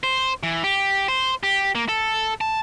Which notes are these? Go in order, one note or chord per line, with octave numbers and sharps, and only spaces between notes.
C5
E3
G4
C5
G4
A#3
A4
A5